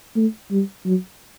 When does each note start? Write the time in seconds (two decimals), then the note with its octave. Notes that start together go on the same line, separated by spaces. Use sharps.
0.16 A3
0.51 G3
0.86 F#3